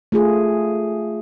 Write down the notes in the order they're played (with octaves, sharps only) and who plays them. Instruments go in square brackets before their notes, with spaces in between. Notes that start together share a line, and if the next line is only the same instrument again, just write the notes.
[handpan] A3 F4 G#4